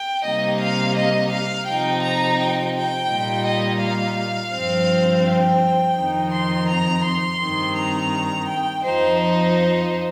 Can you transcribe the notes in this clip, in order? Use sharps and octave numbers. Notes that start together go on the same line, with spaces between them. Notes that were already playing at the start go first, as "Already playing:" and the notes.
Already playing: G5
C3 G3 A#3 D#4 D#5
F5
D#5
F5
C3 F3 D#4 G5
A#5
G5
G5
A#2 G3 A#3 D#4
D#5
F5
G2 F3 C4
G5
F2 D#3 C4 D#4
C6
A#5
C6
G2 D#3 C4
A#5
G5
F2 F3 D#4 C5
C5